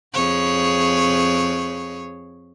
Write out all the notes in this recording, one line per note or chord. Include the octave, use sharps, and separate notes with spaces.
F2 G#4 C#5